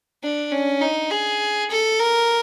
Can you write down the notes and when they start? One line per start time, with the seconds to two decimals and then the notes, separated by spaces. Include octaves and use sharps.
0.23 D4
0.52 C#4
0.81 D#4
1.11 G#4
1.71 A4
1.99 A#4